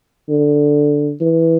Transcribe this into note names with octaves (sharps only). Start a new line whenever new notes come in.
D3
E3